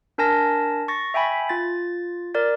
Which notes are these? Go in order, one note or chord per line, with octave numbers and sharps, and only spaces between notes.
D4 A#4 G#5 A5 A#6
C#6 A6 A#6
E5 G5 G#5 B5
F4 A6
A#4 D5 A6